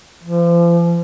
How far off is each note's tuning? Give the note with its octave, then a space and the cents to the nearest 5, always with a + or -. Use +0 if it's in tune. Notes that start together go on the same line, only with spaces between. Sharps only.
F3 -35